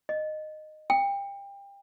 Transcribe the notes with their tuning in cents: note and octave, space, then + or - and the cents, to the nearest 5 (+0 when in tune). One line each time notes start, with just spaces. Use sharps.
D#5 -15
G5 +30